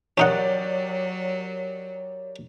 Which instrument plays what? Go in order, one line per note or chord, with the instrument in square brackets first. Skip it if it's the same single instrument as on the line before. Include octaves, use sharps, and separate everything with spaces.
[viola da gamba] F#3 [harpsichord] C#4 D#4 F#5 [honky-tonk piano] G4 A#4 D5 [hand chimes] C#5